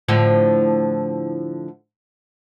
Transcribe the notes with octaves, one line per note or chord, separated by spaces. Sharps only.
A2 D3 F3